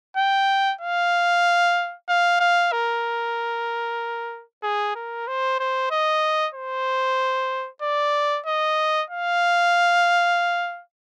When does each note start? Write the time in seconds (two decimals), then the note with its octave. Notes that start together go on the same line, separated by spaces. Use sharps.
0.17 G5
0.81 F5
2.08 F5
2.40 F5
2.72 A#4
4.63 G#4
4.95 A#4
5.28 C5
5.60 C5
5.91 D#5
6.54 C5
7.82 D5
8.46 D#5
9.10 F5